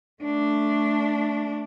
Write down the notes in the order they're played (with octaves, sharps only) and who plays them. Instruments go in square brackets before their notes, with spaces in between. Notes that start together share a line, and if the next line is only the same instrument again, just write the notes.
[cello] A3 D4